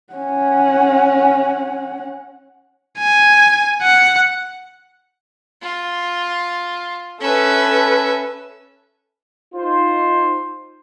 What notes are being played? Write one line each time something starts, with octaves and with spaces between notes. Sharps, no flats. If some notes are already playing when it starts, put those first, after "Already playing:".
C#4 F#5
G#5
F#5
F4
C#4 A4 B4 E5
D#4 F4 C5